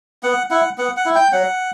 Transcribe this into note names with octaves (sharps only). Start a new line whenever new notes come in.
B3 F#5
E4 F#5
B3 F#5
F#5
E4
G5
F#3 F#5